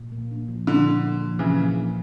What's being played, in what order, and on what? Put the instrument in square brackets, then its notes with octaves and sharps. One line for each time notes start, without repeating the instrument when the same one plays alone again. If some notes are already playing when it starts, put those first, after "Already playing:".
Already playing: [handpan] A#2
A#3
D4
F3
[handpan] A#2 [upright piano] D3
[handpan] A#3
D4
F3
[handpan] A#2 [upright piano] C#3 E3
[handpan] A#3
D4